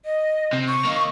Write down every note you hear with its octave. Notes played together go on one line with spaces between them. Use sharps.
D#5
C3
C#6
A#3 D#4